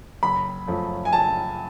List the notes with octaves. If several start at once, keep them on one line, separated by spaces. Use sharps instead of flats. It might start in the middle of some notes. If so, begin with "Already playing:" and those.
F#1 B5
F#2 F3 A3
G#5
F#1 A5